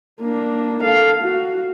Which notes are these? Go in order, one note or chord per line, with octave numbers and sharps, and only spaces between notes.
A#3 D4
A4 F5
F#4